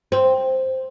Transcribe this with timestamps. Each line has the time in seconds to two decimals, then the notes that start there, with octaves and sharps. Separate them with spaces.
0.12 C4